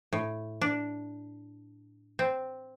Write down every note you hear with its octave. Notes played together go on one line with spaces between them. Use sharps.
A2
D4
C4